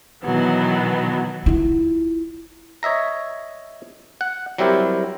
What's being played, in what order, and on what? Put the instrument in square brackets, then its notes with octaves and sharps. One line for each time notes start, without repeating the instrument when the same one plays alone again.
[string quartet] B2 D#3 E3 F#3 B3
[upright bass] E4 F4
[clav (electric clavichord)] C#5 D#5 E5 A#5
F#5
F#3 G3 C4 E4 G4 A#4